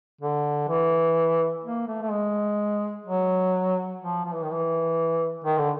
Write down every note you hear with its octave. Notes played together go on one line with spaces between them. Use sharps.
D3
E3
A#3
A3
A3
G#3
F#3
F3
F3
E3
D#3
E3
D#3
D3